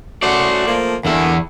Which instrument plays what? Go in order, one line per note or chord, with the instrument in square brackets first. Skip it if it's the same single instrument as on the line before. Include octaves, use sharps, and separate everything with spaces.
[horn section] A3 C#4 F#4 [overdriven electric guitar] C5 D5
[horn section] F3 A3 A#3
[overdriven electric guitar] E2 E4 [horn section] D3 G3 A#3